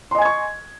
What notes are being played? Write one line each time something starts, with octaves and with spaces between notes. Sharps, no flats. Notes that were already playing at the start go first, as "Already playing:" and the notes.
D#5 G#5 C6 C#6 G#6